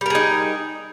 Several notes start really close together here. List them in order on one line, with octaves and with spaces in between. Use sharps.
G3 A#4 G#4 D#4